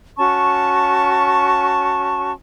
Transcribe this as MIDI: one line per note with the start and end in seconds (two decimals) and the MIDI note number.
0.18 2.32 61
0.18 2.32 66
0.18 2.32 81
0.18 2.32 85